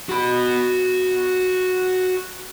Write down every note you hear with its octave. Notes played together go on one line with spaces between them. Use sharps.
F#4 B5